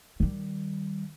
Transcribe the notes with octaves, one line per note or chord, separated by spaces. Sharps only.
D#3 G3